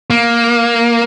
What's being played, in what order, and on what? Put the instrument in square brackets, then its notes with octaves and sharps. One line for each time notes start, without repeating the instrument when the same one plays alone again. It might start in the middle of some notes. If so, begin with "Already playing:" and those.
[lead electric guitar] A#3